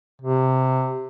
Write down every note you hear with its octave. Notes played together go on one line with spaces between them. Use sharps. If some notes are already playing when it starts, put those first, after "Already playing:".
C3